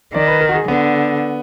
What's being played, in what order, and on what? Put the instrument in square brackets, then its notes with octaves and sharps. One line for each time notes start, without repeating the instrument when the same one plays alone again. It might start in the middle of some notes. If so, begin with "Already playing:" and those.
[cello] D#3 [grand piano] D5
[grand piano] B4
A#4
F#4
G#4
[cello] D3 [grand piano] B3